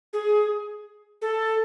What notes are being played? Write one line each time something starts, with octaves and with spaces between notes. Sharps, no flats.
G#4
A4